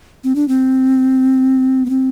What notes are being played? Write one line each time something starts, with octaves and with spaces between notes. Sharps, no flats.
C4
D4
C4
B3
C4